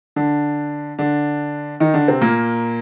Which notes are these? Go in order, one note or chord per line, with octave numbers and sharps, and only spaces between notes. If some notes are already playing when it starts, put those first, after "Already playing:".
D3 D4
D3 D4
D#3 D#4
D3 D4
C3 C4
A#2 A#3